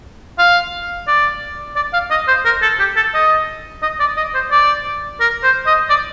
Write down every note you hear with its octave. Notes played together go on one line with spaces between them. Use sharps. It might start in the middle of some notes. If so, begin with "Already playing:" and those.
F5
D5
D5
F5
D#5
C5
A#4
A4
G4
A4
D#5
D#5
D5
D#5
C5
D5
A#4
C5
D#5
D5